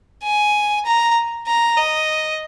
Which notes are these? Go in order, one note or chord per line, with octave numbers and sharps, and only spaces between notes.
G#5
A#5
A#5
D#5